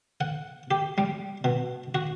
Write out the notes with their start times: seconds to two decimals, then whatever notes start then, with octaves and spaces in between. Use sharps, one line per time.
0.21 F#5
0.71 G4
0.98 G3
1.44 B2
1.95 F#4